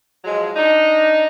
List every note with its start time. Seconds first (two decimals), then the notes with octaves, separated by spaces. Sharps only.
0.25 F3 F#3 G#3
0.56 D4 D#4